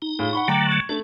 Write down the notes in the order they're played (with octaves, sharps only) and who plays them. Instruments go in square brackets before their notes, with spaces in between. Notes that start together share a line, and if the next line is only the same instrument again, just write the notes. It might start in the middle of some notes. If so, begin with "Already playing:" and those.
[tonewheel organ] D#4
[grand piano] A2 F4 G#4
F#5 B5 C#6
[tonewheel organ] D3 F#3 A3 [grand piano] G5 A#5 D6
[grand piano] C#6 G#6
[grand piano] A3 [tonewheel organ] D4